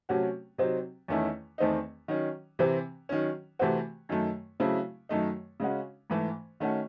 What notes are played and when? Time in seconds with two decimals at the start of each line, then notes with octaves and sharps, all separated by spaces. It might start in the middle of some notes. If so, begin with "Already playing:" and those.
0.09 C3 F#3 A3 C#4 F#4
0.58 C3 F#3 C4 D#4
1.08 E2 D#3 A3 C#4 E4
1.58 E2 D#3 A3 C4 D#4
2.08 D#3 F#3 C#4
2.59 C3 E3 C4
3.09 D#3 F#3 C#4
3.59 C3 E3 A3 C4 F#4
4.09 F#2 D#3 A3
4.60 C#3 F#3 A3 C4 E4
5.09 F#2 D#3 F#3 A3 D#4
5.60 C#3 G#3 C#4 F#4
6.10 G#2 E3 A3
6.60 D#3 A3 C#4 F#4